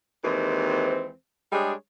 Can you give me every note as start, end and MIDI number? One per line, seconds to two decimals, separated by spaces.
0.24 1.11 39
0.24 1.11 52
0.24 1.11 56
0.24 1.11 60
0.24 1.11 72
1.52 1.73 55
1.52 1.73 56
1.52 1.73 62
1.52 1.73 68
1.52 1.73 73